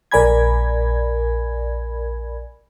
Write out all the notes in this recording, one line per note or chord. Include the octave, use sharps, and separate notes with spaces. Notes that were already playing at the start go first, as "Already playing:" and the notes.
A#1 A#4 D5 G#5 B5 G#6